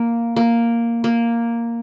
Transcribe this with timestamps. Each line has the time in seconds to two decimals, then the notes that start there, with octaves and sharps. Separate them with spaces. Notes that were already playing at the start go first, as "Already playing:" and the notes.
Already playing: A#3
0.36 A#3
1.04 A#3